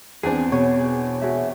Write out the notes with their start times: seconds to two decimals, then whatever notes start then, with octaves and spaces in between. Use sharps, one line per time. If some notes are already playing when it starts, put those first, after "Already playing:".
0.23 E2 C4 D4 G#4 B4 G#5
0.52 B2 G#4 C#5
0.79 G#4
1.22 F#4 G#4 E5